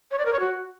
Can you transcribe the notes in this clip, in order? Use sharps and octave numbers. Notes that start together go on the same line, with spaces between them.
C#5
D5
A#4
C#5
F#4